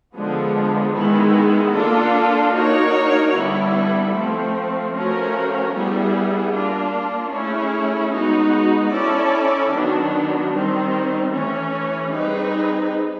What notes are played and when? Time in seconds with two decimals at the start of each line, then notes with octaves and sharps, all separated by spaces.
0.16 D3 F3 G#3 B3
0.95 D#3 G#3 B3 E4
1.74 A#3 D4 F4 A4
2.54 A#3 D#4 F#4 A#4 C#5
3.34 D3 G3 B3 E4
4.14 F3 A3 C4
4.94 F3 A3 C#4 F#4 A#4
5.73 G3 B3 E4 G#4
6.53 A#3 D4 F4
7.32 A3 C#4 E4 G#4
8.13 G#3 B3 D#4 F#4
8.92 C#4 E4 A4 D5
9.72 D#3 F#3 B3 D4
10.52 D#3 G3 C4
11.31 E3 A3 C#4
12.11 G3 C4 D#4 G#4 B4